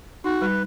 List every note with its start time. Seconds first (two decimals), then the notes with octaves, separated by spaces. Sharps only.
0.24 D#4 F#4
0.41 G3 B4